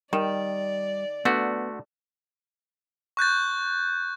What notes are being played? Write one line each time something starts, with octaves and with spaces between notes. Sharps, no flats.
D#3 G3 D5
D3 A3 B3 F#4
C#6 F#6 G6 A6